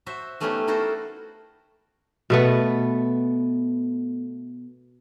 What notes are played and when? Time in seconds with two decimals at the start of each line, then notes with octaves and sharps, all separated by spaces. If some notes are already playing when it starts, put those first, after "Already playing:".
0.06 F#4 C5 E5
0.40 G3 A3 B3 C#4 D#4 G4
0.67 D#4 E4 F#4 A4 A#4 C5
2.30 B2 A3 B3